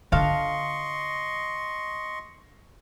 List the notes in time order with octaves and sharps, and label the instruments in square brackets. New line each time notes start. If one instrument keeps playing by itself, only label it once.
[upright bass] D3 F4 [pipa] D4 A4 F5 [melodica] D#5 C6 C#6